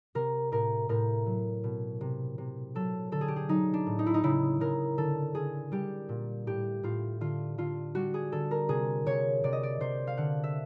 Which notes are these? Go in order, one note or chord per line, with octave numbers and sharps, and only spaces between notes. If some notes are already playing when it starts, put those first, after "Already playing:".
C3 A#4
A2 A#4
A2 A#4
F#3
B2
C3
C3
F#3 A4
D3 A4
G#4
G4
G#4
F#3 D#4
D4
A2
D#4
E4
D#4
C#3 E4
C#3 A#4
D3 A4
D3 G#4
G3 G4
A#2
A2 G4
A2 F4
D3 F4
D3 F4
G3 F#4
G#4
D3 A4
A#4
C3 G#4
C3 C#5
C3 D5
D#5
D5
C3 C5
F5
D3 F#5
E5